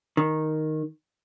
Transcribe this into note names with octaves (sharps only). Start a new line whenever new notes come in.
D#3